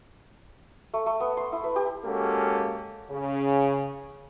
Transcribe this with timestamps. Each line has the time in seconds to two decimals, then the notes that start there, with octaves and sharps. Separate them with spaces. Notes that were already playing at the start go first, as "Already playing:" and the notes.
0.94 A3
1.06 A3
1.20 B3
1.37 C6
1.52 E4
1.64 B4
1.76 G4
2.04 G#3 A#3 C#4 F#4 G4 A4
3.10 C#3